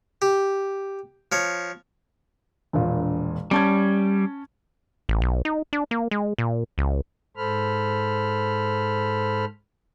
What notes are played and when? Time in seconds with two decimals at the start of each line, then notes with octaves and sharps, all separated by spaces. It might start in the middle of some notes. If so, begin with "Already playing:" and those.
0.22 G4
1.32 F3 C#5
2.73 E1 A#1 A#2
3.51 G3 C#4 A5 G#6
5.09 A1
5.22 B1
5.45 D#4
5.73 D4
5.91 A#3
6.11 G#3
6.38 A#2
6.78 C#2
7.37 G#2 A4 C5 B5 F6